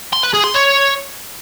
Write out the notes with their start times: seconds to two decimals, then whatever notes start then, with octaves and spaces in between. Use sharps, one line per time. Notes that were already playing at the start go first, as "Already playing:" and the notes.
0.13 C6
0.23 B4
0.34 G#4
0.44 C6
0.54 C#5